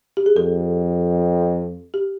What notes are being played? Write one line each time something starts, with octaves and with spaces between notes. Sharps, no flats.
G4
G#4
F2 A4
G4